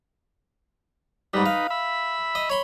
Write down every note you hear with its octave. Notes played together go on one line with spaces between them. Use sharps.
G#2 G3 D#4 B4
F5
E5 B5
D#5
C#5 B5 C6